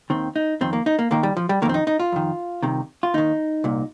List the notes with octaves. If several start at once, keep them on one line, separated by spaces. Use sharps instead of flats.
D#2 D#3 C4
D#4
F2 D#3 C4
A#3
D#4
A#3
D#2 D#3 A#3
G3
F3
G3
F2 D#3 A#3 C4
D#4
D#4
F4
F2 D#3
C2 C3 D#3
F4
D#2 D#3 D#4
C2 A#2